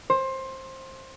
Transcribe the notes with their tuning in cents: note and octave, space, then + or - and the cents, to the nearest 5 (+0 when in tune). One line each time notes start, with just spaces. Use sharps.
C5 +20